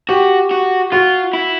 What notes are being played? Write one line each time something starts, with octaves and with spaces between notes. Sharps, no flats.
F#4 G4
F#4
F4 F#4
E4